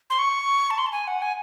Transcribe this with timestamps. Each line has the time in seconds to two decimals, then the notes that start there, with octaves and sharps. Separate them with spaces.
0.10 C6
0.19 C#6
0.71 A5
0.78 C6
0.86 A5
0.92 G#5
1.07 F#5
1.22 G#5